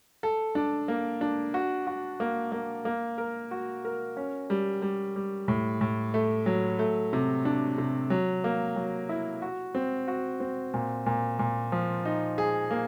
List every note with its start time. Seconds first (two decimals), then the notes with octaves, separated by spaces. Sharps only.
0.23 A4
0.55 D4
0.88 A#3
1.21 D4
1.54 F#4
1.87 F#4
2.20 A#3
2.52 A#3
2.85 A#3
3.18 A#4
3.51 F#4
3.85 A#4
4.17 C#4
4.50 G3
4.82 G3
5.16 G3
5.48 A2
5.81 A2
6.14 A3
6.46 F#3
6.79 A3
7.13 C3
7.45 D4
7.78 C3
8.10 F#3
8.44 A#3
8.76 F#3
9.09 E4
9.42 F#4
9.75 C4
10.08 F#4
10.40 C4
10.74 A#2
11.06 A#2
11.39 A#2
11.72 F3
12.05 D#4
12.38 G#4
12.71 A#3